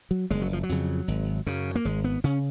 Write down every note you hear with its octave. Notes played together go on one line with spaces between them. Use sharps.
F#3
F#1 G#3
F#3
F3
F#3
F2 C#3
G#1
F#2 C#3
A#3
G#1 G#3
B3
C#3 C#4